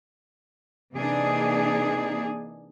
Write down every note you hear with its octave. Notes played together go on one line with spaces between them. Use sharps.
C3 E3 A#3 D4 D#4 G#4